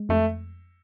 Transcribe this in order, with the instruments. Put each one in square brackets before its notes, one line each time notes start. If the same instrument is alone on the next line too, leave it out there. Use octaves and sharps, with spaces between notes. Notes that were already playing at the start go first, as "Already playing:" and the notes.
Already playing: [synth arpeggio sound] G#3
[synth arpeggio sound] F2 [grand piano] A3